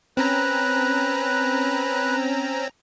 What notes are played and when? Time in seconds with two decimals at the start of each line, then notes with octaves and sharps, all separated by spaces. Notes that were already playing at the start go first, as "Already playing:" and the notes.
0.17 C4 C#4 B4 A#5 F#6